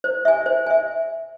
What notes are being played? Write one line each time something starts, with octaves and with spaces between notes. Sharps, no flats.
C5
E5 G#5
C5
E5 G#5